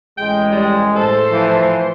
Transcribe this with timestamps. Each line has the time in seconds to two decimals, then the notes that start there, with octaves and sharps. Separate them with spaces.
0.17 A1 G#3 G5
0.52 G3
0.96 A2 A3 A4 C5
1.31 E3 F3